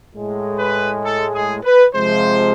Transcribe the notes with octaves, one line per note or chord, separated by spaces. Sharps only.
A2 G#3
B4
A4
G#4
B4
C3 F3 G#3 C5